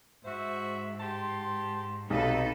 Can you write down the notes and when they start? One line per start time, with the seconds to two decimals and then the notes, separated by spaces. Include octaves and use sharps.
0.25 G#2 F#4 C5 E5
1.00 G4 A5 C6
2.10 B1 C3 D#4 A4 B4